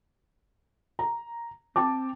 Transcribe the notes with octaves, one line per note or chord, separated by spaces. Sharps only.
A#5
C4 G5 A5 D6